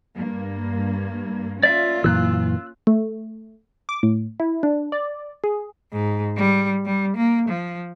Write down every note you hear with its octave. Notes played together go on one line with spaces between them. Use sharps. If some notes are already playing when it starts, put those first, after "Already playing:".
G2 A#3
A#3 C#4 F4 D5 E5
F#2 A#2 E3 E6 F#6
A3
D6
A2
E4
D4
D5
G#4
G#2
G3
G3
A#3
F3